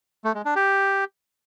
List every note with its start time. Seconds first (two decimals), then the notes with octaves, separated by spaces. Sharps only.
0.24 A3
0.35 G#3
0.45 D4
0.55 G4